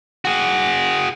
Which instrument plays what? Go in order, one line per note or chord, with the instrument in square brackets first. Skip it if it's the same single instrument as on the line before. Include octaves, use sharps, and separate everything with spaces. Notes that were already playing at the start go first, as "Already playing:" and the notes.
[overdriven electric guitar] F#4 G#4